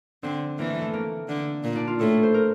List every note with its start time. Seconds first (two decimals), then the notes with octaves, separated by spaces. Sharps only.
0.23 D3 C4
0.58 E3 A#3
0.70 A3
0.82 A3
0.94 A#3
1.28 D3
1.64 A#2
1.75 D4
1.87 F4
2.00 A2 A4
2.23 C5
2.34 A#4